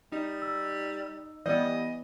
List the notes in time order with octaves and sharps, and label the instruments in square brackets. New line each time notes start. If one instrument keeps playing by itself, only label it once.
[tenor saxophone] G3 [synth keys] D#4
[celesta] E6
[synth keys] E3 G3 B3 [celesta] D5 [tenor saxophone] D#5